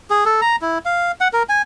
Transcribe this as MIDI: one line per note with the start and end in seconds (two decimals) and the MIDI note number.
0.10 0.24 68
0.25 0.41 69
0.42 0.56 82
0.61 0.78 64
0.85 1.12 77
1.20 1.28 78
1.33 1.43 70
1.49 1.62 80